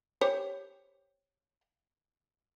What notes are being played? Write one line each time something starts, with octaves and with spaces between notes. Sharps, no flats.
G4 C5 C#5